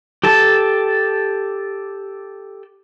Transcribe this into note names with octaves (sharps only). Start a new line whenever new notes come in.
G4 A4 A5